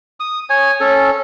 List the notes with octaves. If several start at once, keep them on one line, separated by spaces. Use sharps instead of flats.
D#6
C#5 G#5
C#4 A4